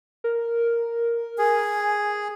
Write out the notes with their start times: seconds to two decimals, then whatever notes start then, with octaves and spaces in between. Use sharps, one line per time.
0.24 A#4
1.39 G#4 G#5